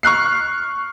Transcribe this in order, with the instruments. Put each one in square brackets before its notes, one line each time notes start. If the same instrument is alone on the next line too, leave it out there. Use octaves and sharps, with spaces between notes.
[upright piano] C#6 F6 F#6 C7